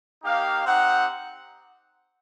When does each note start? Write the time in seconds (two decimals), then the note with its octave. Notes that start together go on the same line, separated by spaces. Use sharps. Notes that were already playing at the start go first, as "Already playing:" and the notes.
0.23 A#3 D#4 G4 F5
0.66 C4 D#4 G4 F#5